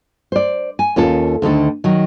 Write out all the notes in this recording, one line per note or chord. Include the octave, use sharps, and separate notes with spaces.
C5 D5
G#5
D#2 C#4 F4 A4
D2 D3 D#3 A4
D#3 F#3